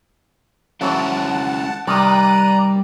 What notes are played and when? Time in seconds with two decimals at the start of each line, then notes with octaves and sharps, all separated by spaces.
0.81 E3 F#3 G#3 C4 C#4 E4 F#5 A5
1.87 C3 D#3 G3 D5 A#5 F#6 D#7